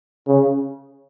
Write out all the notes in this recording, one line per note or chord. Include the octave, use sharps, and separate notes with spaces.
C#3